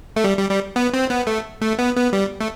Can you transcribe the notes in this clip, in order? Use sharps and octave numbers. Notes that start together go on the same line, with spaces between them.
A3
G3
G3
G3
B3
C4
B3
A3
A3
B3
B3
G3
A3